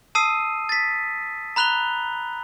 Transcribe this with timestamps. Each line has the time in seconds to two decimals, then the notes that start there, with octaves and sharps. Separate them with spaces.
0.15 A5 D#6 E6 C7 D#7
0.69 A6 B6
1.56 A#5 B5 F#6 F7 G7